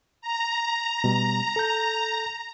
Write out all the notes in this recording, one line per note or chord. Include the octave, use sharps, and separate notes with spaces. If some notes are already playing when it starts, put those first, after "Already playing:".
A#5
B2 G3
A4 G6